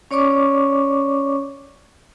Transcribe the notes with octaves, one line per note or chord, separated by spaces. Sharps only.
C#4 C#5 D5 C#6 D6